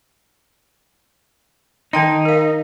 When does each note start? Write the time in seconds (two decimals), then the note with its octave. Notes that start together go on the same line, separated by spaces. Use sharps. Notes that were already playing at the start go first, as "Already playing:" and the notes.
1.93 D#3 D#4 G5 C6
2.25 A#4 F5